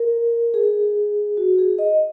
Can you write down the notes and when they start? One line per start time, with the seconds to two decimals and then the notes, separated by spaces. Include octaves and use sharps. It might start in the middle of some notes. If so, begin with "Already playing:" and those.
Already playing: A#4
0.54 G#4
1.37 F#4
1.58 G#4
1.79 D#5